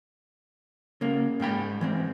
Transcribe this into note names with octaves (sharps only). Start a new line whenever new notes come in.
C#3 A#3
G#2 G#3 G5 B5
E3 G#3 C4